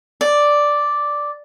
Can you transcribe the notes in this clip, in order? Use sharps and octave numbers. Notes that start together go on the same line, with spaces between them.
D5